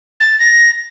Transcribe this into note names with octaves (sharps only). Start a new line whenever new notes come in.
A6
A#6